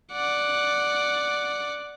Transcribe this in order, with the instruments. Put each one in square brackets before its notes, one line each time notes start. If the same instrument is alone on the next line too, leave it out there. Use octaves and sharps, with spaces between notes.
[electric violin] D5 F#5